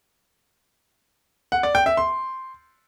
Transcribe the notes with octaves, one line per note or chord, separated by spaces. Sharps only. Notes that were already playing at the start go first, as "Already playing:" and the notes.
F#5
D5
G5
E5
C6